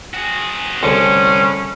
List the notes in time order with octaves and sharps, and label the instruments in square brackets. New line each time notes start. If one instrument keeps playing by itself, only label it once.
[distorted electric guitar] F#4 G#4
[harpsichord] C2 D3 G#4 [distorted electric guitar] A2 [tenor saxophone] C#4